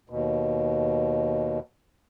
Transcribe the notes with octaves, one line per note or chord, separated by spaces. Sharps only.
D#2 B2